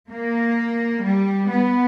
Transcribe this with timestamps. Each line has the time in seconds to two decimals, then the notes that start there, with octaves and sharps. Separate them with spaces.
0.10 A#3
1.04 G3
1.51 B3